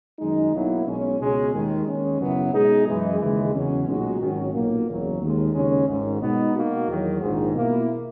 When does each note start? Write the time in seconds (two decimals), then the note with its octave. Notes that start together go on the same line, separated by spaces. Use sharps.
0.19 F#2 D#3 G#3 D#4
0.53 B1 B2 F#3 A#3 E4
0.86 B1 B2 G#3 C#4
1.20 C#2 B2 G#3 C#4 G#4
1.53 D#2 D#3 G#3
1.87 D#2 D#3 G#3 C#4
2.20 F#2 C#3 F#3 B3 E4
2.53 B2 G#3 D#4 G#4
2.86 F#2 E3 G#3
3.20 D#2 C#3 E3 G#3
3.53 E2 C#3 F#3 C#4
3.87 B1 A#2 G#3 D#4 F#4
4.20 G#1 G#2 D#3 F#3 C#4
4.53 B1 A#2 F#3 A#3
4.87 F#1 E2 C#3 F#3
5.20 D#2 D#3 G#3
5.53 D#2 C#3 G#3 C#4
5.87 G#1 G#2 D#3
6.20 B2 G#3 B3 D#4
6.54 B2 A#3 D#4 F#4
6.87 E2 D#3 F#3
7.21 A#1 G#2 D#3
7.54 B2 A#3 E4